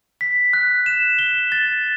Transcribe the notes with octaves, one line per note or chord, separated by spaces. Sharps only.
B6
F#6
E7
G7
A6